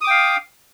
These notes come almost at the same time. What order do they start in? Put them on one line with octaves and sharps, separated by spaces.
D#6 D6 G5 F5